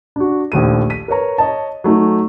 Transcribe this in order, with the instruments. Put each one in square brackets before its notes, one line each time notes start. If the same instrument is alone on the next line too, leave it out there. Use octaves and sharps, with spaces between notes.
[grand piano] D4 F#4
A#1 D#2 A3 D#7
B6 D#7
A#4 B4 C#5 A#5
C#5 D#5 A5
F#3 A3 D#4